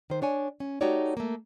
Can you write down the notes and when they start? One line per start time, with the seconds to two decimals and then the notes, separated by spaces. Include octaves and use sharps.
0.10 D#3 C5
0.22 D4 C#5 G#5
0.60 C#4
0.81 A3 D#4 F#4 G4 C#5 D5
1.17 A3 A#3